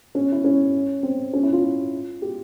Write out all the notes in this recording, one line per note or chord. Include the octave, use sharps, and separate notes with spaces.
C#4
E4
C#4
C4
C#4
E4
F4
G4